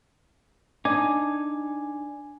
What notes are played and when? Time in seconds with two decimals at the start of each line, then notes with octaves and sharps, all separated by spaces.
0.85 D4 D#4 G#5 D6